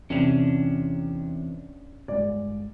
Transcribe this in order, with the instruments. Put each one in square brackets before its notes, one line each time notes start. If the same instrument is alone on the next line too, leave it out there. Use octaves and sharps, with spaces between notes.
[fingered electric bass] E2 [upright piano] C3 F7 [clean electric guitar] C#4 D4
[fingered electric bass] G1 G#3 [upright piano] D5